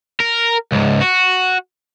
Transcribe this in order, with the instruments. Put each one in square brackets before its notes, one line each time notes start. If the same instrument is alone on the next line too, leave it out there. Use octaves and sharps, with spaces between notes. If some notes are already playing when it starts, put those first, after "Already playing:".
[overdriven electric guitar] A#4
C#2 G#2
F#4